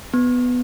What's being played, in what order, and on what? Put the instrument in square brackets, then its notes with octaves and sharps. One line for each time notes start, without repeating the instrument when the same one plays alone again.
[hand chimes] B3